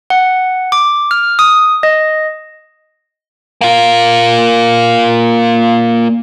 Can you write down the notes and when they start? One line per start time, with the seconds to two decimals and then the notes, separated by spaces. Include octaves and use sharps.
0.10 F#5
0.72 D6
1.11 F6
1.39 D#6
1.83 D#5
3.61 A#3 F4